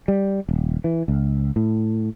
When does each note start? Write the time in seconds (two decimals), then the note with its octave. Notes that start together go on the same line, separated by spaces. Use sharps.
0.08 G3
0.49 D#1
0.84 E3
1.08 C#2
1.56 A2